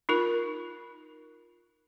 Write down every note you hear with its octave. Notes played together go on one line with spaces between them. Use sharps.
D#4 F4 A#4